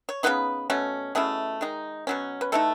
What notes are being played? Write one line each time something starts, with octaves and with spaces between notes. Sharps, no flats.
C#5
C#3 F#3 B3 D#4 B4
B2 A3 C#4
B2 A3 C#4 E4 G#4
D#3 G#3 D#4
B2 F#3 C#4
B4
E3 A3 D#4 A4